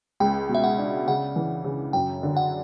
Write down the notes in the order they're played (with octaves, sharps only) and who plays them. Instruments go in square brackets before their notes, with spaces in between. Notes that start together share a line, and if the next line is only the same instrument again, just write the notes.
[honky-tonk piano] C#2 [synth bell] G5
[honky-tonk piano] B2
[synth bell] E5
F#5
[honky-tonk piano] D4
[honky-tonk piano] C#3 [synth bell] F#5
[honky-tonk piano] E3
C#3
[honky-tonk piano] F#2 [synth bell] G5
[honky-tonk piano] D3
[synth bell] F#5